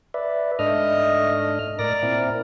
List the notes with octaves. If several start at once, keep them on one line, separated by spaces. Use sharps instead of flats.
B4 D5 E5
G#2 A3 D4 D#5 F6
A2 A#4 D5 A#6
A#2 C4 E4